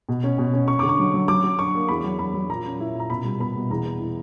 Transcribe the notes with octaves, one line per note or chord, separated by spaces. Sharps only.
B2
C#4
B2
C#4
C#4 C#6
D3 D6
C#6
F#3
F#3
F#3 D6
F#3
D4 C#6
A#3
E2 B5
F#3
F#3 B5
F#3
A#2 A#5
C#4
E4
A#2 A#5
B2 B5
G3
B3 B5
B2
E2 A#5
B3
E3